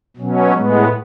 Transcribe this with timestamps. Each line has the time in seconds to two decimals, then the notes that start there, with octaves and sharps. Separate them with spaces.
0.17 B2 F#3 C#4
0.53 A2 G#3 B3